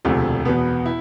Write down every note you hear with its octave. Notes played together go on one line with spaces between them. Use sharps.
E1 D2 C3 F3 A3
E2 B2 B3
E4